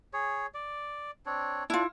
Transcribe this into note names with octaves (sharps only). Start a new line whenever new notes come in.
G#4 C#5
D5
C4 D4 C#5
D4 E4 F4